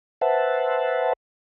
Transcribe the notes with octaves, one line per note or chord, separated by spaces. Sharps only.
B4 C5 E5 F#5 A5